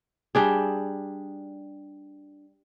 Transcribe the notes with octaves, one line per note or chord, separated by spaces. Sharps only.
G3 D4 G#4